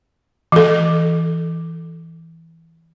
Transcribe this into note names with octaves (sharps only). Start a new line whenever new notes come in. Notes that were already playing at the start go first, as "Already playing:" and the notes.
E3 A4